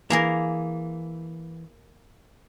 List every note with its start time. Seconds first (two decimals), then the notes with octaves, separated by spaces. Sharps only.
0.10 E3 A#3 G#4 A#4